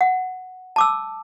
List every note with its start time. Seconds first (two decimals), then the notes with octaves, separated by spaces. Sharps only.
0.01 F#5
0.76 A5 D6 E6